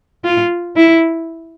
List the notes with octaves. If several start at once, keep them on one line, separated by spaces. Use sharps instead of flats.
F4
E4